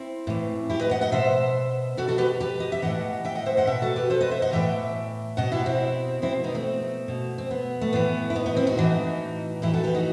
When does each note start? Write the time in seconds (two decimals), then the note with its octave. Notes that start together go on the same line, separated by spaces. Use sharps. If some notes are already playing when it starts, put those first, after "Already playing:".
Already playing: C4 E4
0.27 A2 E3
0.70 E4 G4
0.81 B4 D#5
0.91 D#5 F#5
1.01 D#5 F#5
1.12 B2 C5 E5
1.97 B2 F#4 A4
2.08 F#4 A4
2.18 G4 B4
2.40 G4 B4
2.60 D#5
2.72 E5
2.82 A2 E3 D#5 F#5
3.25 E5 G5
3.35 D#5 F#5
3.46 C5 E5
3.57 D#5 F#5
3.67 B2 E5 G5
3.82 F#4 A4
3.96 G4 B4
4.10 A4 C5
4.21 B4 D#5
4.31 C5 E5
4.42 D#5 F#5
4.52 A2 E3 E5 G5
5.37 B2 D#5 F#5
5.52 E4 G4
5.66 C4 E4
6.22 B2 C4 E4
6.44 B3 D#4
6.55 A3 C4
7.08 B2
7.38 C4
7.51 B3
7.81 A3
7.93 A2 E3 B3
8.30 E4
8.36 B3 D#4
8.46 B3 D#4
8.56 C4 E4
8.67 D#4 F#4
8.78 A2 E3
9.62 A2 E3 E4 G4
9.74 F#4 A4
9.84 G4 B4
9.95 D#4 F#4